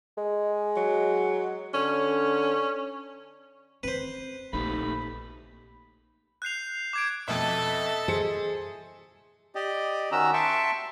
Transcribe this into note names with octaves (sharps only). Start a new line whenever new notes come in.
G#3
F#3
D3 C#4
C4 B4 C5
A#1 A3 A#3 D#4 G4 B5
F#6 G6 C7 F7
D6 G#6 D7
F2 B2 A4 D#5 E5
G#4 C5 C#7
G4 D5 D#5
D#3 C#4 F#4 A#5 E6
E5 G5 A5 C6 C#6